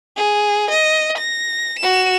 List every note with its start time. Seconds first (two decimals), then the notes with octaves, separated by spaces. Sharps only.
0.17 G#4
0.71 D#5
1.18 A#6
1.80 F#4 E7